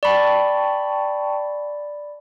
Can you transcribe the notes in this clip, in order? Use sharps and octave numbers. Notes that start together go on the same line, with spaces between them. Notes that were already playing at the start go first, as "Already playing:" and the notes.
D5 G5 A5 B5 C#6